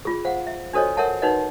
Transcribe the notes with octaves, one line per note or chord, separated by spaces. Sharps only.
F4 G#4
C5 F5 F#5
E5
D4 F#4 A4 C5 C#5 D#5
A#4 C#5 E5 F#5 A5
D#4 F#4 B4 C#5 D#5 F#5